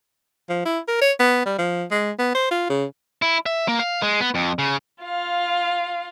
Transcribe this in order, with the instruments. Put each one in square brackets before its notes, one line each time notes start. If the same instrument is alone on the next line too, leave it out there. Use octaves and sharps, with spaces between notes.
[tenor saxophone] F3
E4
A#4
C#5
B3
G3
F3
G#3
B3
C5
F4
C#3
[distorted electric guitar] E4
E5
A#3
F5
G#3
B3
F2
C#3
[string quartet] F4 F5